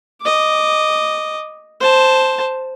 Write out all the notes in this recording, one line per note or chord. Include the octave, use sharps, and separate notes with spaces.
D#5 D6
C5 A5